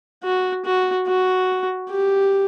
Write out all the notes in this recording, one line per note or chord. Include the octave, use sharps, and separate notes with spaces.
F#4
F#4
F#4
G4